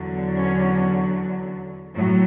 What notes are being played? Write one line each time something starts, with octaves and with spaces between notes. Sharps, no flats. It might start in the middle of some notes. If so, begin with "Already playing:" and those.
Already playing: E2 D3 F#3
C#4
A2 F#3